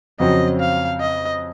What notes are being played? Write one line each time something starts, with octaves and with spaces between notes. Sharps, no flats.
F2 C#3 F#3 C4 D#5
F5
D#5